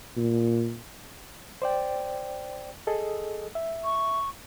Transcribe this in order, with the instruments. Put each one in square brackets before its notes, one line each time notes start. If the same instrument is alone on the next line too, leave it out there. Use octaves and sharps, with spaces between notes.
[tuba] A#2
[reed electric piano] C5 D5 G5
G#4 A4 D#5
E5
[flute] C#6